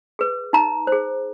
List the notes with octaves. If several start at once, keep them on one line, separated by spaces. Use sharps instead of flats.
G#4 B4
D#4 A#5
G#4 C5